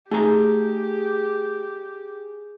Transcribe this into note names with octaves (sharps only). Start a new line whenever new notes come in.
A3 D#4 G4 G#4 A#5